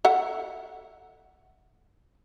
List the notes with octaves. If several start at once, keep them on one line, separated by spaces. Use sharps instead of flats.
A4 E5 F#5